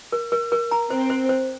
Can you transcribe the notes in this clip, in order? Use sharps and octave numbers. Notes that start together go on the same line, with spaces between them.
A#4
A#4
A#4
A#5
C4 C5
C5
C5